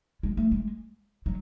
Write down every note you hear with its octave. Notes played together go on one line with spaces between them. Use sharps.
G#3
A3
G#3
F#3